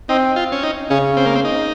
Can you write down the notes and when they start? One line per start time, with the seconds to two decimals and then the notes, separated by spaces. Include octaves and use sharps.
0.09 C4 D#4
0.36 F4
0.52 C#4
0.63 D#4
0.90 C#3 C#4
1.17 C4
1.26 A#3
1.35 C4
1.45 D#4